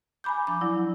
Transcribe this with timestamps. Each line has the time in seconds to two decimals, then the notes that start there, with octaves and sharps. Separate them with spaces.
0.24 G#5 A#5 B5 D6 G6
0.47 F3 D4 D6
0.61 F#3 E4 D5